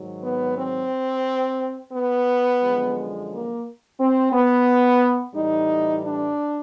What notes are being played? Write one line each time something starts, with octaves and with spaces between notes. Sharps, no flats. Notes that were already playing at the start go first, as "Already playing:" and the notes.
Already playing: G#2 D#3 F#3
B3
C4
B3
F#2 D3 F3 G#3
A#3
C4
B3
A2 E3 G3 D#4
D4